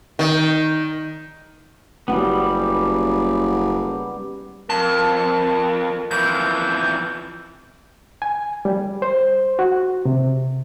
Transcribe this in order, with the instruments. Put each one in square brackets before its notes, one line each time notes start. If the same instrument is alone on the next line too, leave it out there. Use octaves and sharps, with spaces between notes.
[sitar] D#3
[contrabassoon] F#1 [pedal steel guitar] G3 B3
[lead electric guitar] F2 [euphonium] A#4 [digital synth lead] A5
[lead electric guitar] F2 E3 [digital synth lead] G6
[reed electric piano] G#5
G3
C5
F#4
C3